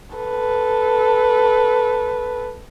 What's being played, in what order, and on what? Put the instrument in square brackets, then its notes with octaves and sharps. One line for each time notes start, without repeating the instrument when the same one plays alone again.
[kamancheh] A4 B4